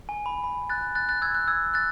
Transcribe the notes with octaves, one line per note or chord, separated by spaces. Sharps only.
G#5
B5
B5
F#6 A6
F#6 A6
F#6 A6
E6 G#6
F#6
E6 G#6
F#6 A6